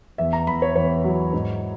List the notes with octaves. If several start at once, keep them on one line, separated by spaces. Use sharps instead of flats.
E2 E5
A#5
E2 B5
C#5
E2 C#5
F#3
G#2